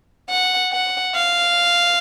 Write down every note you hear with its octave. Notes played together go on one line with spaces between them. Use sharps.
F#5
F#5
F5